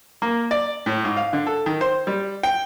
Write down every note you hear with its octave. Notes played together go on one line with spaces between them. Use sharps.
A#3
D5
A2
G#2
F5
D3
A4
D#3
C5
G3
G5